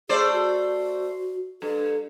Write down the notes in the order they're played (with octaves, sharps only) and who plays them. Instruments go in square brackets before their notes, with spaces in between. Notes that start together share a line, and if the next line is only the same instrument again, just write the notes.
[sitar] A3 C5 D5 [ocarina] G#4
[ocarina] F#4
[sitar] G2 [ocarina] A4